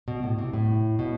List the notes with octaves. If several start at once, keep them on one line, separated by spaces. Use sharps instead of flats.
B2
A2
C3
A2
B2